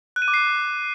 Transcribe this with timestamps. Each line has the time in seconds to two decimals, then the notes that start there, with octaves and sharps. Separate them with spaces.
0.16 F#6
0.22 D#7
0.28 D6
0.34 C7